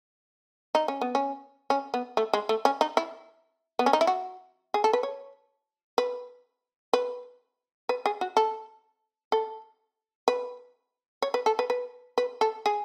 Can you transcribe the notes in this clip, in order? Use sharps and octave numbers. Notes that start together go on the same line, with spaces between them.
D#4
C#4
B3
C#4
C#4
B3
A3
G#3
A3
C#4
D#4
E4
B3
C#4
D#4
E4
F#4
G#4
A4
B4
C#5
B4
B4
B4
G#4
F#4
A4
A4
B4
C#5
B4
A4
B4
B4
B4
A4
G#4